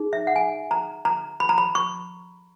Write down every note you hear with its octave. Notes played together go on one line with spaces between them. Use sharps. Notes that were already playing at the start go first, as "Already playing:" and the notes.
Already playing: D#4 G#4
E5
F#5
G#5
A#5
A#5
B5
A#5
B5
C#6